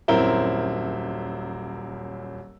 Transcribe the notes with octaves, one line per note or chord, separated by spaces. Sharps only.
D#1 F#2 C4 E4 A#4 G7